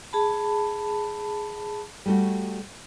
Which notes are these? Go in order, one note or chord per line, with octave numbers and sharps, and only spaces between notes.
G#4 A5 B5
G3 A3 F#4